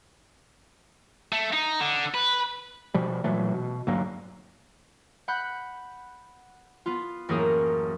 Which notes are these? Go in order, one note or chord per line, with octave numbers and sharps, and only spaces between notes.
A3
D#4
D3
B4
B2 F3 G3
A#2 E3 F#3 A3
B2
D2 G2 F#3 A#3
F#5 B5 F#6 G6
B3 F4
A1 F#2 A#3 G#4 A#4 D#6